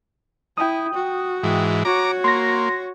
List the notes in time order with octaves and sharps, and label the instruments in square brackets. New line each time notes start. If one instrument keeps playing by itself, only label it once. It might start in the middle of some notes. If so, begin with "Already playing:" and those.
[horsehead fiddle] E4 [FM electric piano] G5 D#6
[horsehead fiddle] F#4
[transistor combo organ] G#2 E3
[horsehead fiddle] F#4 C#5 [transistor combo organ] A#5 D6
[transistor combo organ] A#3 [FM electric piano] C6 A#6